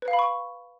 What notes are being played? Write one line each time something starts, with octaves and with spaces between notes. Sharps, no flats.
B4
F5
B5
C#6